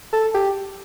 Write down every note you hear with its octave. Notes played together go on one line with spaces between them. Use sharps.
A4
G4